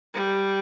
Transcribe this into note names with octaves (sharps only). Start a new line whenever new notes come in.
G3